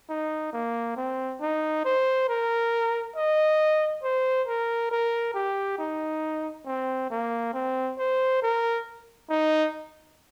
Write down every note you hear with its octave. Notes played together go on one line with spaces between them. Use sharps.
D#4
A#3
C4
D#4
C5
A#4
D#5
C5
A#4
A#4
G4
D#4
C4
A#3
C4
C5
A#4
D#4